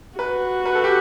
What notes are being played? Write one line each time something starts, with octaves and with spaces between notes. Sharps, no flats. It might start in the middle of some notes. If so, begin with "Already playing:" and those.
F#4 B4
B4
A4
G4